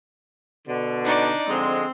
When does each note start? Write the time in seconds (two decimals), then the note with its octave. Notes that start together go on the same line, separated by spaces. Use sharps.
0.67 B2 D3
1.03 D4 D#4 D5
1.48 D3 F3 G#3 C4